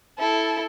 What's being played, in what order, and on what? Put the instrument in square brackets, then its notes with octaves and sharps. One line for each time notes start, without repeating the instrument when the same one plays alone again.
[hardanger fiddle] E4 [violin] A4